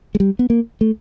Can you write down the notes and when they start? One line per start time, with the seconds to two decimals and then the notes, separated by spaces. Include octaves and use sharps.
0.15 G#3
0.20 G3
0.39 B3
0.50 A#3
0.81 A3